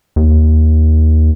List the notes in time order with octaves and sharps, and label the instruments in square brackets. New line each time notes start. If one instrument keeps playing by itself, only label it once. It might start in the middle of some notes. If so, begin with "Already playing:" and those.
[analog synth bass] D#2